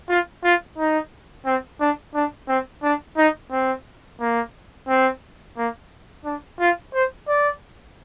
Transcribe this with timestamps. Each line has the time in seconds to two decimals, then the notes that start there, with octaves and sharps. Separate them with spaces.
0.09 F4
0.44 F4
0.78 D#4
1.45 C4
1.80 D4
2.15 D4
2.48 C4
2.83 D4
3.17 D#4
3.51 C4
4.20 A#3
4.88 C4
5.57 A#3
6.25 D4
6.60 F4
6.94 C5
7.29 D5